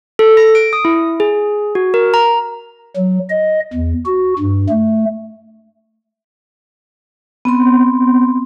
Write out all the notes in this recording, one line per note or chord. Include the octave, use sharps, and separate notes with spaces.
A4
A#6
D7
D#6
E4
G#4
F#4
A#4
A#5
F#3
D#5
E2
F#4
G2
A3
B3 C4 C6